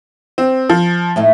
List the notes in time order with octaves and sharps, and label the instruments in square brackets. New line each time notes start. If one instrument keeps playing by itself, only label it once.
[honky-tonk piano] C4
F3
[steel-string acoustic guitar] A2 A3 D#4